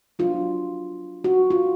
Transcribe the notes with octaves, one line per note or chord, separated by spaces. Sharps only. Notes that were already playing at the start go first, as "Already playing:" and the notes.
F#3 B3 D4 F4
F#4
F4